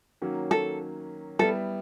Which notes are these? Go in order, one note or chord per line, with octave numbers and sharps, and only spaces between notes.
D#3 F#3 A#3 C#4 F#4
A4
G3 B3 E4 A4